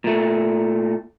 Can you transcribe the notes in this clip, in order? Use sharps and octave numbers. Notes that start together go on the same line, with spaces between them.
A#2 A3